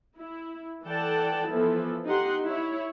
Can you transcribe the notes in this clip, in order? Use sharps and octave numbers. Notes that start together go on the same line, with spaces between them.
E4
E3 A4 D5 F#5 G5 A5
E3 F3 B3 E4 A4
D#4 G4 F#5 C6
E4 C#5